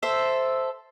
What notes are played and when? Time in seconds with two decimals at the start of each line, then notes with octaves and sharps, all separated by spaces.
0.03 A4 C5 E5